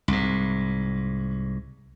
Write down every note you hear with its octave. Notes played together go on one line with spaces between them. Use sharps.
C2 G#2